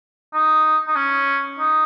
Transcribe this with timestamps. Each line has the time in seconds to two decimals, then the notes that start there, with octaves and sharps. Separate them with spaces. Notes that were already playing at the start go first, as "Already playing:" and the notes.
0.33 D#4
0.88 D#4
0.96 C#4
1.59 D#4